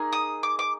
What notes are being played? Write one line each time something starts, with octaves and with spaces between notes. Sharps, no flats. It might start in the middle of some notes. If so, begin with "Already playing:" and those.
Already playing: A#3 D#4 G#4
D#6
D6
D6